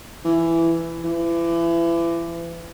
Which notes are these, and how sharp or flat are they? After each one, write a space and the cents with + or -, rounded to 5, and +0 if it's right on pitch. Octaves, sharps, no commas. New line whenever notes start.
E3 +10
E3 +35